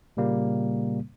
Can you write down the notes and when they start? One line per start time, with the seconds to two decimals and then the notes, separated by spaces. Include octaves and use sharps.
0.17 A#2 C#3 G3 A#3